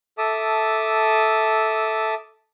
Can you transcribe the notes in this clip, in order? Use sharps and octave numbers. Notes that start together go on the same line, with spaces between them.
A4 E5 A5 D6 D#6